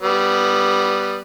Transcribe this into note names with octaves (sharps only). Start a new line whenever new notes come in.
G3 B3